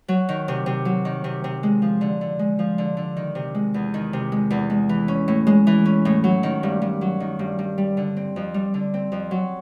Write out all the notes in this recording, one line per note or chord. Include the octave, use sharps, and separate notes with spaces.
F#3
D#3
C3
C3
F#3
D#3
C3
C3
G#3
F3
D3
D3
G#3
F3
D3
D3
D#3
C3
G#3
E2
D#3
C3
G#3
E2
G#3
E3
C#4
A2
G#3
E3
C#4
A2
F#3
D#3
G2
G2
F#3
D#3
G2
G2
G3
D3
C4
F2
G3
D3
C4
F2
F#3